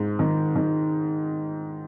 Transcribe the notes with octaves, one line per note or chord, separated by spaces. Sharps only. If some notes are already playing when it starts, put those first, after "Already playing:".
Already playing: G#2
D#3
D#3